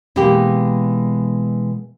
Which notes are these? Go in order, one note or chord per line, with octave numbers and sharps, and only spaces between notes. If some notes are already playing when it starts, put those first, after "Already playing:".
B2 E3 G#3 A#3 G4